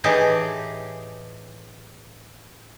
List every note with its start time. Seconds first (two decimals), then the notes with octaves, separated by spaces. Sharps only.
0.04 A2 E3 D#4 G4 G#4 A5